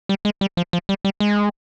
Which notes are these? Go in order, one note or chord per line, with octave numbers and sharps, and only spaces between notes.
G3
G#3
G3
F3
F3
G3
G3
G#3